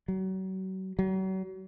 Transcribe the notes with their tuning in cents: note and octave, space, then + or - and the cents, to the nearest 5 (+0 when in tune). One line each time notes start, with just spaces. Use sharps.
F#3 +35
F#3 +40